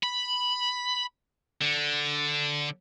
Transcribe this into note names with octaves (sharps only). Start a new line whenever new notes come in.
B5
D3